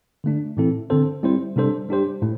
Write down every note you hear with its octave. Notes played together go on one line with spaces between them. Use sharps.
D3 A3 D4
A2 E3 C4 E4 A4
D3 C4 A4 C5
G3 C4 E4 C5
C3 G3 D4 A4 C5
G3 D4 G4 C5
A2 A3